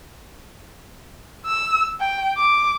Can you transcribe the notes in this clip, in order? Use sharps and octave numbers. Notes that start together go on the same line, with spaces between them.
E6
G5
D6